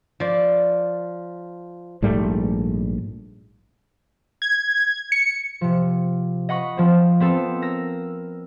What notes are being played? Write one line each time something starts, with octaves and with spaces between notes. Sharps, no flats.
F3 D5
A#1 G#2 G3 A3
G#6
C#7
C3 F3
D#5 F#5 B5 C#6
F3 C4
B3 C4 A4
A#4 E6 A#6